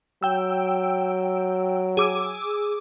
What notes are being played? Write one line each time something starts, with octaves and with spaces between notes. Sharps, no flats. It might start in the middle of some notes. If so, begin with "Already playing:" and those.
F#3 G5 E6
G#4 D6 E6